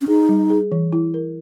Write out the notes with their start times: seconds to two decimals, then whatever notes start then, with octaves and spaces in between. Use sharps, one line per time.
0.01 C#4
0.08 D#4 G#4
0.29 G3
0.50 G#4
0.72 E3
0.93 E4
1.14 A#4